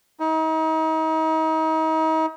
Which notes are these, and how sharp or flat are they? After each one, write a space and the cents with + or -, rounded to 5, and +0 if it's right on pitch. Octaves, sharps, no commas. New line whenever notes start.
D#4 +35